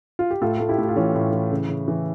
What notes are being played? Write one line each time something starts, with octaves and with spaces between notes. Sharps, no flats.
F4
G4
A2 F4 A4
A2 A4
E4 G4
A2
F4
E3 C#4 E4
A2
E3
C#3
C#3
E3